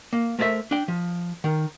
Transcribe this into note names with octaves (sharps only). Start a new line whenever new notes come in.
A#3
A3 A#4 C5 D5 E5
D4 G5
F3
D#3 A#4